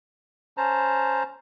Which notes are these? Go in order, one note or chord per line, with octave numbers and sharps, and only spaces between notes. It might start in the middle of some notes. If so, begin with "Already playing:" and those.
C#4 C5 A5 A#5